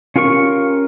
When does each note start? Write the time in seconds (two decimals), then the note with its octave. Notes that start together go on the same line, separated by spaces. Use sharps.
0.16 C#4 F4 G4 A#4 C#6